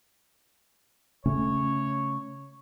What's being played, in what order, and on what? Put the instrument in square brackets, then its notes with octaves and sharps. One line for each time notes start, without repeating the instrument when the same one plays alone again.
[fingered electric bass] C#3 A3 C#4 [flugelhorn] C#5